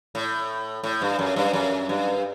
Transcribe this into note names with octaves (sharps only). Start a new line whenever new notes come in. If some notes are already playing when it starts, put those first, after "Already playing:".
A2
A2
G2
F#2
G2
F#2
G2